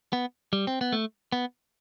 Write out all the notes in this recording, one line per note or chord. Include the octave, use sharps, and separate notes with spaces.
B3
G3
C4
B3
A3
B3